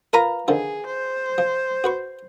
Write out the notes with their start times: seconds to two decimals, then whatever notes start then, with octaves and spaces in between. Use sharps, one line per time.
0.13 F4 A#4 B4 A#5
0.48 D3 D#3 F3 G#4
0.86 C5
1.38 F3
1.84 F#4 B4 C#6